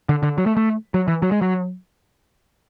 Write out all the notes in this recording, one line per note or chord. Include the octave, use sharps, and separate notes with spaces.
D3
D3
F#3
A3
A3
F#3
E3
F#3
G#3
F#3